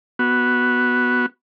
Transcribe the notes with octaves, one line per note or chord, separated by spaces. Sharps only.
B3 F#4